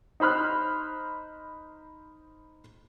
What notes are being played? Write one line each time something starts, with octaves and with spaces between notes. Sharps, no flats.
D#4 C5 B5 F6 F#6